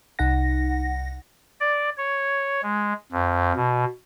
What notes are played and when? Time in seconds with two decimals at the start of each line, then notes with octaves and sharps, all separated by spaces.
0.19 C2 D#4 F#5 A#6
1.60 D5
1.97 C#5
2.63 G#3
3.12 F2
3.56 B2